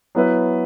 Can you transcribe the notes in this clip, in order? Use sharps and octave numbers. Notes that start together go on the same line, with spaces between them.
F#3 B3 E4 B4 E5